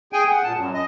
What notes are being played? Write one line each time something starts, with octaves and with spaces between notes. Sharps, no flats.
G#4 G5 G#5
F#5
A#2 A5
F#2
D#5